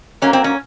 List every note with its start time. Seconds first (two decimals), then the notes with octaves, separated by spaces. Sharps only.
0.22 G#2 F#3 A#3 C#4
0.33 C4
0.44 C#4